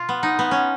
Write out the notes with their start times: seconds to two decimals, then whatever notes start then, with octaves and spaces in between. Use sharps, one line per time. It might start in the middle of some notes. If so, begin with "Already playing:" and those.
Already playing: B2 F4
0.09 B3
0.23 D#4
0.39 B3
0.51 C#4